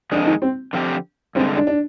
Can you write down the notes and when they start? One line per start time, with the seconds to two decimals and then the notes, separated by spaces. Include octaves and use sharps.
0.11 F2 D#3 G#3 D4
0.26 D#4
0.42 C4
0.73 D3 F3 C4 G4
1.35 G2 D3 G#3 C4
1.57 D4
1.67 D4